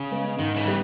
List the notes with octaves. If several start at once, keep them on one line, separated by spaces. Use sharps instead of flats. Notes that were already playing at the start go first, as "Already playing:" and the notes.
Already playing: C#3
G#3 B3
G#2 D#3
C#3 E3
G3 B3 G4